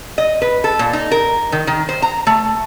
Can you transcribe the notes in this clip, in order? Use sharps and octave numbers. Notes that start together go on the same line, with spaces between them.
D#5
B4
A4
A#2
D#4
A#4
D#3
D#3
C5
A#5
A3